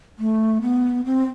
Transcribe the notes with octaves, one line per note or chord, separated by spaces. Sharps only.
A3
B3
C4